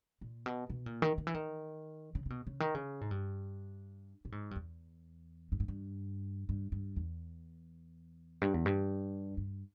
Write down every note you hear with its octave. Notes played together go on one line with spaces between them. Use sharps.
A#2
B2
B2
A#2
D#3
D#3
E3
D#3
C#3
C#3
B2
C#3
D#3
C#3
G#2
G2
A#2
G#2
G2
E2
G2
G#2
G2
G2
G2
E2
G2
E2
G2
G2